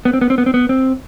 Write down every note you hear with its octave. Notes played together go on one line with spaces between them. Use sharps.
B3
C4
B3
C4
B3
C4
B3
C4